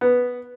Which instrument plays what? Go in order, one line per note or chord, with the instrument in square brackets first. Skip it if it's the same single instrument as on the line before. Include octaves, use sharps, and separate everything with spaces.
[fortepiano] B3